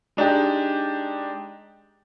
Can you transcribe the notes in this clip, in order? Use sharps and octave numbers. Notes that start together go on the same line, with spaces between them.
G#3 D4 D#4 G4